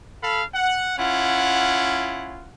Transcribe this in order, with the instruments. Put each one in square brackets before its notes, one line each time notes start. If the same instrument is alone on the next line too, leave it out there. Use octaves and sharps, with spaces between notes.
[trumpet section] A4 F5 B5
F#5
[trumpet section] C#4 E4 F4 [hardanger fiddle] F#5